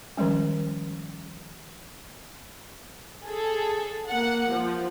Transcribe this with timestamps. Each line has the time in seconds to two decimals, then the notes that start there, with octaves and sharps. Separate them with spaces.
0.17 D#3 F3 G3 G#3 C#4
3.24 G#4 A4
4.09 A#3 F#5
4.53 F3